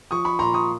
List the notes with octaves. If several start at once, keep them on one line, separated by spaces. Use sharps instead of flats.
F3 C#6 D#6
B5 C#6
A#2 A#5 C6
C#6 D#6